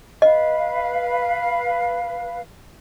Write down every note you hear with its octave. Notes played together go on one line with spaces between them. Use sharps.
B4 D#5 F5